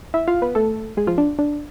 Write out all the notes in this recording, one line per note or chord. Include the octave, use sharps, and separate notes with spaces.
E4 E5
F4 F5
B3 B4
A3 A4
G#3 G#4
F3 F4
D4
D4